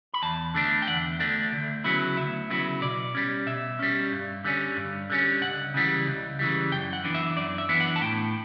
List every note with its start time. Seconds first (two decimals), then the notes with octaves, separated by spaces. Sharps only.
0.14 B5
0.23 E2 A5
0.55 D3 A3 D4
0.82 G5
0.87 E2 F#5
1.20 D3 A3 D4
1.52 D2
1.84 C#3 F#3 B3 E4
2.17 D2 E5
2.50 C#3 F#3 B3 E4
2.81 B2 D5
3.15 G3 C#4
3.46 B2 E5
3.79 G3 C#4
4.12 G2
4.45 D3 G3 C#4
4.77 G2
5.10 D3 G3 C#4
5.41 C#2 F#5
5.74 C#3 E3 G3
6.07 C#2
6.39 C#3 E3 G3
6.71 F#2 G5
6.93 F#5
7.04 E3 B3 D4
7.15 E5
7.36 F#2 D5
7.58 E5
7.69 E3 B3 D4
7.80 F#5
7.96 A5
8.01 A2 G5